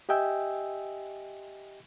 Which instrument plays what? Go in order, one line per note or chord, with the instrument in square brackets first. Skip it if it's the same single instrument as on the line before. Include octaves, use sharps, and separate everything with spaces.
[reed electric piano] G4 D#5 E5 G5 G#5 E6